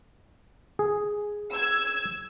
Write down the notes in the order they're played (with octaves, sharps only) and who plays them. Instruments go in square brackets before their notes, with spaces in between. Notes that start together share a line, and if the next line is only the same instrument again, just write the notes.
[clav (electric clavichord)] G#4
[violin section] E6 G#6